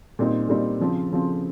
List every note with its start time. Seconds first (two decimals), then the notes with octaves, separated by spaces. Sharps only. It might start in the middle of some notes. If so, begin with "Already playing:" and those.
0.19 A#2 G3 C4 D#4
0.49 A#2 G3 C4 D#4
0.80 C#3 F3 C4
1.11 C#3 F3 C4